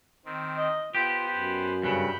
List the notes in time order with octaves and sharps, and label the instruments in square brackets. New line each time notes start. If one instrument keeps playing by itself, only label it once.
[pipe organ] D#3 C4
[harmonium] D#5
[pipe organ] B3 C5 [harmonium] F4 [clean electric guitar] G4
[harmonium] F#2
[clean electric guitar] G2 C#3 [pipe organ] B5 F#6 G6